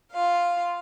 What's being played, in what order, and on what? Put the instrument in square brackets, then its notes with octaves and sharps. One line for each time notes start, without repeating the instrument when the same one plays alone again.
[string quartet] F4 F5